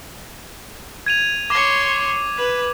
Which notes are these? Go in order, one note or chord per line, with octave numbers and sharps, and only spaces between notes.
G#6 D#7 F7
C#5 C6 D6
B4